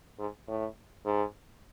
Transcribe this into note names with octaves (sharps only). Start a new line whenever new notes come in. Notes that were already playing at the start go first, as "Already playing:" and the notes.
G#2
A2
G#2